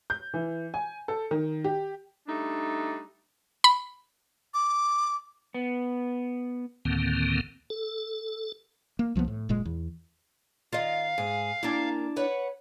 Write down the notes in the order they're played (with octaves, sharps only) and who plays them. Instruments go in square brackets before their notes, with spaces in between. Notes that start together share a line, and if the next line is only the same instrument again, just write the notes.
[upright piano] G6
E3
G#5
A4
D#3
G4
[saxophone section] G3 A3 D4 D#4
[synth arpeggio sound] B5
[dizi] D6
[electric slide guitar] B3
[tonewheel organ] D2 A2 D3 D#3 A#3 C4
A4
[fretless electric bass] A#3
C2 F3 A#3 B3
A2
F#1 A#2 G#3
E2
[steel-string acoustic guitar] D#3 [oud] F4 D#5 [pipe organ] F5
[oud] G#2 [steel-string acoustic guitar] G#4
[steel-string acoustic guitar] A#2 A#3 A#5 [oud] D4 E4
[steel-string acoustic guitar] B4 C#5 F#5